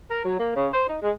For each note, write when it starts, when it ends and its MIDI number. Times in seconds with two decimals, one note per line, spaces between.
0.10 0.24 70
0.25 0.39 54
0.40 0.51 58
0.55 0.69 49
0.72 0.85 72
0.87 0.97 63
1.02 1.12 56